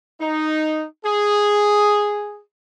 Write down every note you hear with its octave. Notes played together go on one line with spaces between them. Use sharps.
D#4
G#4